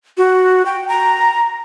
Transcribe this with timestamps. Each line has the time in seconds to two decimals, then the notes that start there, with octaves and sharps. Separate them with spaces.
0.17 F#4
0.66 G5
0.89 A#5